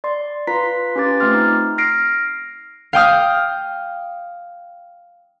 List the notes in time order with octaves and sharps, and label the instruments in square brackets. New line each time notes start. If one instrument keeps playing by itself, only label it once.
[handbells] D5 C6
F4 B4 A#5 C6 B6
C#4 F4 G4 B4 D6 A6
A3 C4 C6 F6 A6
D#4
F6 A#6 C7 D7
[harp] F5 G5 D#6 F6